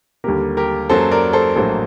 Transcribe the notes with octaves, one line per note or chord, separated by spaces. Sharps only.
D#2 D3 G3 A#3 G4 A#4
G4 A#4
F#2 F#3 A#3 A4 C5
A#4 D5
A4 C5
A#1 A2 F#3 A#3 A4 C5